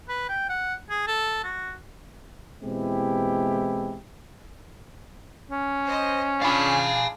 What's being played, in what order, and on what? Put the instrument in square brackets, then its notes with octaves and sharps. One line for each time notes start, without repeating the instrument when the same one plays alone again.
[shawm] B4
G5
F#5
G#4
A4
F#4
[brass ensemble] B2 E3 G#3 C4 E4 G4
[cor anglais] C#4
[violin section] C5 D#5
[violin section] D4 F4 G#4 [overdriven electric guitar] F5 B5